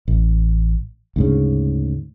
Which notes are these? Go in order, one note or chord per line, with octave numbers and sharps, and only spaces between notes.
A1
D2 G#2 C#3